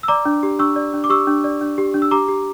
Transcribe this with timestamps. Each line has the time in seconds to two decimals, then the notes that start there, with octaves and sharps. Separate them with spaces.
0.03 E6
0.08 D5 A#5 D6
0.26 D4
0.43 G4
0.59 D4 C#6 E6
0.76 D5
0.94 D4
1.04 D6
1.09 G4 C#6 E6
1.27 D4
1.44 D5
1.61 D4
1.78 G4
1.94 D4
2.02 E6
2.11 G4 A#5 D6
2.28 G4